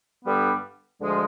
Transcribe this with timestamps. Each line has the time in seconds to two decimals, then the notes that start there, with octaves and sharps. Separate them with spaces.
0.25 G2 D3 G3 B3
1.00 D2 D3 F3 G#3